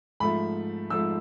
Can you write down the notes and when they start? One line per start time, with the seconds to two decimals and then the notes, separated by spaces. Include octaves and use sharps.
0.20 G#2 F3 A3 B5
0.90 G#2 F3 A3 E6